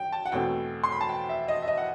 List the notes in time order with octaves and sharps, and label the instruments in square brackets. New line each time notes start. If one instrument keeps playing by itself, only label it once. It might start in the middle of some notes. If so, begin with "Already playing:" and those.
Already playing: [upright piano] G5
A5
F#5
E2 B2 A3 C4 G5
C6
B5
A5
G5
E5
D#5
E5
D#5
F#5